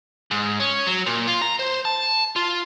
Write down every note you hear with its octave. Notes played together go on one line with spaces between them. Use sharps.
G#2
C#4
F#3
A#2
F4
A#5
C5
A5
F4